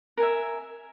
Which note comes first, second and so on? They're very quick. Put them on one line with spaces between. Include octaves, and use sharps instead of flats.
A#4 G#5 E5